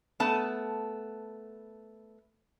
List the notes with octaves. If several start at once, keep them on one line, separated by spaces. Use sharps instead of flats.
A3 B3 A5